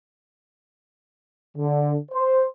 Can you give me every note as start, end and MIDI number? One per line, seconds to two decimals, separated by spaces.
1.57 1.95 50
2.12 2.44 72